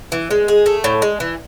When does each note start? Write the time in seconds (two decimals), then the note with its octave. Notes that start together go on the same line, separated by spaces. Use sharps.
0.12 E3
0.31 G#3
0.48 G#4
0.66 A3
0.84 A2
1.02 G#3
1.20 E3